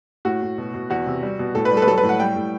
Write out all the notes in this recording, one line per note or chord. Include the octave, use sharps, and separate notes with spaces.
A2 F#4
A2
B2
B2
E2 F#4
C3
G3
B2
A2 A4
B4
G3
A4
B4
F#3 A4
B4
A2
F#5
G3 G5
A2